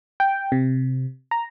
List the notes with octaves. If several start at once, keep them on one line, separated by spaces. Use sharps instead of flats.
G5
C3
A#5